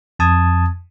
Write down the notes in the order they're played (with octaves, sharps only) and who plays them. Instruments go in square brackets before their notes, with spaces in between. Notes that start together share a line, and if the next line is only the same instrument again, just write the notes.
[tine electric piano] F2 A5 D#6 G#6